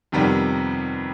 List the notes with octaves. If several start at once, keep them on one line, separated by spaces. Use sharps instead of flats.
F2 C3 D#3 G3 B3